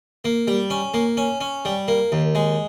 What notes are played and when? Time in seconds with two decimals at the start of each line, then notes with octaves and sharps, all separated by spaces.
0.25 A#3
0.47 G3
0.70 C#4
0.94 A#3
1.17 C#4
1.41 C#4
1.65 G3
1.88 A#3
2.12 D#2
2.35 G#3